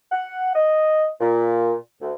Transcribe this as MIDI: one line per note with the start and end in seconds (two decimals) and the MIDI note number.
0.12 0.49 78
0.55 1.07 75
1.21 1.73 46
2.01 2.13 38